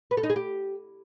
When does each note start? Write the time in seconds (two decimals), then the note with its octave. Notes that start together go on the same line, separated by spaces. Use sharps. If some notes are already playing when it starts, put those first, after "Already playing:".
0.11 B4
0.17 A4
0.23 D#4
0.30 G#4
0.36 G4